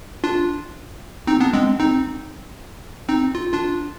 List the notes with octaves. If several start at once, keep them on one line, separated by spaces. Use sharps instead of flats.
D4 F4
C4 D#4
B3 D4
G#3 C4
C4 D#4
C4 D#4
F4
D4 F4